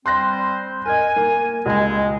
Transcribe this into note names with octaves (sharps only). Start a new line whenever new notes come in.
G3 C4 C5 C6 F#6 A#6
A#4 D#5 G#5
A#3 A#4
C#2 G#3 G#5